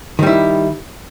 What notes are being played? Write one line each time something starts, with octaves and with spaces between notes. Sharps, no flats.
D#3 G3 E4